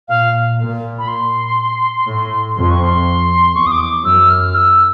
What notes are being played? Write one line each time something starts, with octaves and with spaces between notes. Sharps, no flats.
A#2 F5
A#2
B5
C6
A2
F2 C6
C#6
C6
E2 C#6
D#6
D6
F#2 E6
F6
E6